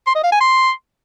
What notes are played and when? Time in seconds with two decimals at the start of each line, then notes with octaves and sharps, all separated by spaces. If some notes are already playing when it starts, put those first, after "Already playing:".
0.07 C6
0.15 D#5
0.24 F5
0.32 G#5
0.41 C6